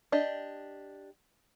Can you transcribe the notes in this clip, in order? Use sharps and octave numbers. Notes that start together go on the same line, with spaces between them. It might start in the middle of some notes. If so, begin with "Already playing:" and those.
D4 G4 D#5